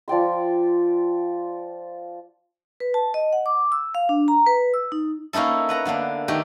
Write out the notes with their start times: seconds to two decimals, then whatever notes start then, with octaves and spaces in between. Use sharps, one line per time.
0.08 F3 D5 G5 C6
2.80 B4
2.94 A5
3.14 D#5
3.33 F#5
3.46 D6
3.72 E6
3.95 F5
4.09 D4
4.28 A#5
4.46 B4
4.74 E6
4.92 D#4
5.33 A#3 C#4 D#4 E4 A4
5.69 B4 F#5 A#5
5.85 D3 A#3 B3 D4
6.28 D#3 A3 G4